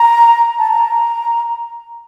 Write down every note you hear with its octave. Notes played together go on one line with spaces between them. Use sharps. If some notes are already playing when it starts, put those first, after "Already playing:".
Already playing: A#5
A5
A#5